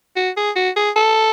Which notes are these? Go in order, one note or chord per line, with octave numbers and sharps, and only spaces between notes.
F#4
G#4
F#4
G#4
A4